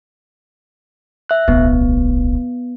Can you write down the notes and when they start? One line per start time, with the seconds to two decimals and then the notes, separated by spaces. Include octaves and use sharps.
1.29 E5 F#6
1.48 D1 B1 B3